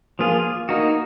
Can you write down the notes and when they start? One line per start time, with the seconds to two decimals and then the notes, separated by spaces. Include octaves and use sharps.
0.19 F3 A#3 F4 G#4
0.69 A#3 D#4 F#4